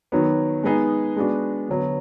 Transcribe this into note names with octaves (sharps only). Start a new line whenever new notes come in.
D#3 F#3 B3
G#3 B3 D#4 G#4
G#3 B3 D4 F#4
D3 F#3 B3